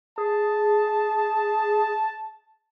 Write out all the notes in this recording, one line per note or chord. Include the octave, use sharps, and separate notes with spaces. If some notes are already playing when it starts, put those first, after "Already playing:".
G#4 A5